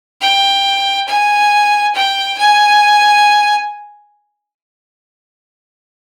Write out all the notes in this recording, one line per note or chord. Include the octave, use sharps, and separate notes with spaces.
G5
G#5
G5
G#5